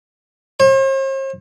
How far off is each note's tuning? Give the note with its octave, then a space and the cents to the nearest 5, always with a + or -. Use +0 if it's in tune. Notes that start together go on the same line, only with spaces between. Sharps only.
C5 +45